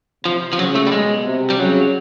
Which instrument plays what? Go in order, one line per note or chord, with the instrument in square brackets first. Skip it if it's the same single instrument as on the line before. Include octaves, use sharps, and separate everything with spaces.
[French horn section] C3 [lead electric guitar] F3
[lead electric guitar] F3
[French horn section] C#3 [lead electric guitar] F#3
[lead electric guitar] A3
G3
[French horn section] B2 [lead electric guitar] G#3
[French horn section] C3
[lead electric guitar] G3
[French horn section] C#3 [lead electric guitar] F#3